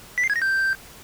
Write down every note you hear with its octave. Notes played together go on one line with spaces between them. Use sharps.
B6
C7
G#6
A#6
G6